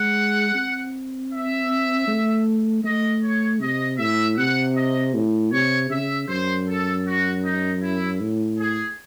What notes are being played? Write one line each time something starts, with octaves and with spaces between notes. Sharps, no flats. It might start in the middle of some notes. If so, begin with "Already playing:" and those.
Already playing: G#3 F#5
C4
E5
A3
A3 D#5
C#5
C3 D#5
A2 E5
C3 F#5
D#5
A2
C3 C#5
C#3 E5
F#2 C5
A4
F#4
D#4
E4
A2
G#4